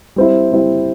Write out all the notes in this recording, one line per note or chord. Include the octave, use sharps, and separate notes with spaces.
G3 C4 E4
G3 C4 E4